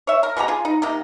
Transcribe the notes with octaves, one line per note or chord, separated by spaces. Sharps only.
C#5 E5
A#4
B2 G#3 G4 A#5
F4 G#4
D#4
C3 A#3 D#4